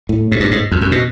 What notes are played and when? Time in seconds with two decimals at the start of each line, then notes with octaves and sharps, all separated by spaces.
0.09 A2
0.32 G#2
0.40 G2
0.51 G#2
0.72 F2
0.81 F#2
0.92 B2